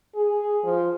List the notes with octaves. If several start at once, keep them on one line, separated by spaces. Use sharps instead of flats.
G#4
F3